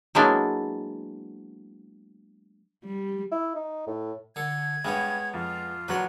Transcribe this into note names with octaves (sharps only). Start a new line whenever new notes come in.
F#3 G#3 A#3 B3 D4 E4
G3
E4
D#4
A2
D3 A4 G#6
G2 G#3 B3 C#5
F2 F4
A#1 F#3 B4 F#5